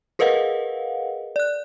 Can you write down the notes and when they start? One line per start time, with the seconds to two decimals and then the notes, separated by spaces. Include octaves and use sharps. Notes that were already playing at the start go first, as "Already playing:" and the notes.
0.19 G#4 A#4 B4 D#5 F5 F#5
1.36 D5 F#6